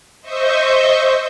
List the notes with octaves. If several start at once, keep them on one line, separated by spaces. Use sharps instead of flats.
C5 D#5 E5 C#6 G6